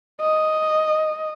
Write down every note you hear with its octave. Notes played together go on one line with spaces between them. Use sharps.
D#5